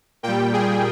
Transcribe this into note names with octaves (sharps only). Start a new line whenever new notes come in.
A#2 G3 G5
G#4